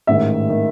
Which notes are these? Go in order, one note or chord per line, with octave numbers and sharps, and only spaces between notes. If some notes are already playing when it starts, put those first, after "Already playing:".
A1 G#2 D#3 E5
D#3